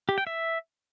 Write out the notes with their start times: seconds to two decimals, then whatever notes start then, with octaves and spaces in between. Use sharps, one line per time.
0.09 G4
0.18 G5
0.27 E5